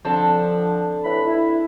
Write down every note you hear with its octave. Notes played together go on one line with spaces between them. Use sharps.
D3 F3 C4 D4 A4
A2 E3 B5
E4